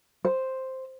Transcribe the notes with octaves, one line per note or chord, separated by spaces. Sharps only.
C5